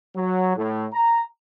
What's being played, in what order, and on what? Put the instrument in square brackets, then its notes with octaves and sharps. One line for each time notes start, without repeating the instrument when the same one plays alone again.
[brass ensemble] F#3
A2
A#5